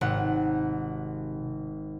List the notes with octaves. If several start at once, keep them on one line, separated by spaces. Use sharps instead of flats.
G#1 C3 F#5